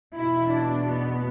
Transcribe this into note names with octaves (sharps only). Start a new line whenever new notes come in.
E2 B2 E4
D4
B3